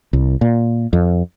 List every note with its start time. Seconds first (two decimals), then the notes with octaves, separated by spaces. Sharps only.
0.13 C2
0.41 A#2
0.93 F2